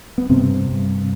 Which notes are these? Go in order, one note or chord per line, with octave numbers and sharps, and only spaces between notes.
B3
G2 C3 C4
G2